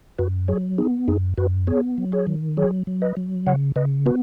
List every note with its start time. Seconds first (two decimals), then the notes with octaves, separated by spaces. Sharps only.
0.18 F#2 F#4 B4
0.48 F#3 G#4 C#5
0.78 B3 D#4 G#4
1.08 F#2 D#4 G#4
1.38 F#2 F#4 B4
1.67 B3 G#4 C#5
1.98 F#3
2.12 G#4 C#5
2.27 D#3
2.57 F#3 G#4 C#5
2.87 F#3
3.02 B4 D#5
3.17 F#3
3.47 C#3 C#5 F#5
3.76 C#3 B4 D#5
4.06 B3 F#4 B4